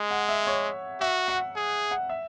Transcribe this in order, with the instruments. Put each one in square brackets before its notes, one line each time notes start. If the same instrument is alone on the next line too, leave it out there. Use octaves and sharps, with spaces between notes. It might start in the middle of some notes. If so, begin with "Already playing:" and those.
Already playing: [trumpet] G#3
[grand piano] F#5
E5
C#5
[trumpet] F#4 [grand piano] E5
[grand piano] F#5
[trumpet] G#4
[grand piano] F#5
E5